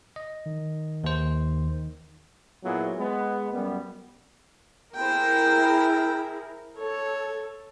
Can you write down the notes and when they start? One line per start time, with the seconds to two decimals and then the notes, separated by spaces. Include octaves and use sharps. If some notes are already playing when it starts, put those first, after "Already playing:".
0.16 D#5
0.46 D#3
1.04 D#2 C5
2.63 A#2 F#3 B3 E4 F4 G#4
2.98 G#3 B3
3.52 F#2 G3 B3
4.95 E4 G#4 A#4 C5 G5
6.78 A4 C#5